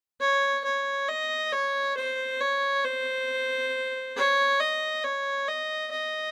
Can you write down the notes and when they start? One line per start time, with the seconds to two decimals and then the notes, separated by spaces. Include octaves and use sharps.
0.21 C#5
0.65 C#5
1.08 D#5
1.53 C#5
1.97 C5
2.41 C#5
2.85 C5
4.16 C#5
4.60 D#5
5.04 C#5
5.48 D#5
5.91 D#5